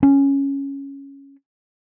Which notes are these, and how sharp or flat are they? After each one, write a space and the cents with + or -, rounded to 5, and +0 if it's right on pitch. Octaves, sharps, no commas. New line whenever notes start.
C#4 +0